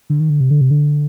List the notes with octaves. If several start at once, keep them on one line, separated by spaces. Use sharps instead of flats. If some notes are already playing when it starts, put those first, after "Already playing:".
D3
D#3
D3
C3
D3
C3
D3